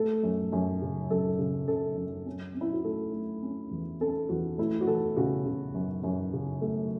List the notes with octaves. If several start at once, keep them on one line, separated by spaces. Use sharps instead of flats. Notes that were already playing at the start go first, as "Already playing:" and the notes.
Already playing: A3 A4
F#2
F#2
C#3
F#2 A4
C#3
C#3 A4
F#2
C#4
C#4
E4
F#4
A3 A4
A3
C#4
E2
C#4 A4
E2 F#4
A3 E4
F#4
E3 A4
C#3 F#4
C#3
F#2
F#2
C#3
A3